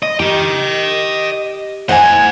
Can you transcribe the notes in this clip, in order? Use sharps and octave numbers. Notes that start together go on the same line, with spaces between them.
D#5
G4 D#5 G5
C5 D#5 F#5 G#5